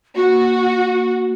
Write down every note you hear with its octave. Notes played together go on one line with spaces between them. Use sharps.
A#3 F#4